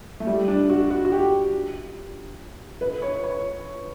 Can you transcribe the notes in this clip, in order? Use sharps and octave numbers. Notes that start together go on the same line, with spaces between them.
A3
G3
D4
F#4
F#4
F#4
G4
B4
C#5
C#5